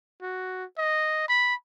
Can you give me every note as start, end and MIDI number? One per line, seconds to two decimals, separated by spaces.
0.22 0.65 66
0.78 1.28 75
1.28 1.55 83